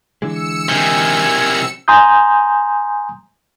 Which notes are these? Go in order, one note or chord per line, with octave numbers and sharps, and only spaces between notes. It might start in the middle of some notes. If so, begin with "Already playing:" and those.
D3 E3 G#3 E6 C#7
C3 D#3 G#5
G#5 A#5 C6 D#6 G6